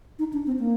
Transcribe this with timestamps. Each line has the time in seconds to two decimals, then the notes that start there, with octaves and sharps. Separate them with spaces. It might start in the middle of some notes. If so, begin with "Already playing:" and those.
0.19 D#4
0.33 D4
0.46 C4
0.59 A#3